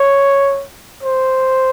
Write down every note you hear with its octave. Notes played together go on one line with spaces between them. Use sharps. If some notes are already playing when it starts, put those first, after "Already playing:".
Already playing: C#5
C5